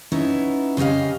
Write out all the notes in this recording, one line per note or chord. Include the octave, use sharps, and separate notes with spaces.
B3 C#4 D#4 E4 C#5
C#3 C#4 G4 D#5 F5